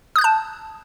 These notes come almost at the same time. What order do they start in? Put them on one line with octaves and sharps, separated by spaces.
D#6 F#6 G6 A5